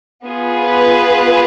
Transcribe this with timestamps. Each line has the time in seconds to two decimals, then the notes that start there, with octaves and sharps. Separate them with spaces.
0.25 B3 F4 G#4
0.63 B4